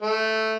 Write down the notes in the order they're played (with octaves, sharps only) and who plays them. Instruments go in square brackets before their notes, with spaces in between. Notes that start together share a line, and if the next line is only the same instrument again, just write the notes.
[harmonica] A3